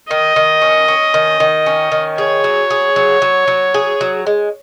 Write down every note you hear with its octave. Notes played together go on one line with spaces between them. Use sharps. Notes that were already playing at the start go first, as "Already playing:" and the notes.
D#3 D#5
D#3
C#4
C#4
D#3
D#3
C#4
D#3
G#4 C#5
F#3
G#4
F#3
F#3
F#3
G#4
F#3
G#3